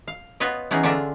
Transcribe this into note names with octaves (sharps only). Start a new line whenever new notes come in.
F5
B3 F4 B4 C#5 D#5
E3 B3 C#4 D#4 G#4
D3 C#4 D4 F4 E5 A#5